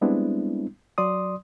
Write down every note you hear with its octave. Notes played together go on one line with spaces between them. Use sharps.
G3 G#3 B3 C4 D4 E4
F#3 D5 C6 D#6